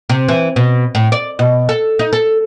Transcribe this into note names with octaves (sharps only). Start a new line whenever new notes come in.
C3
E3
B2
A2
D5
B2
A4
D#4
A4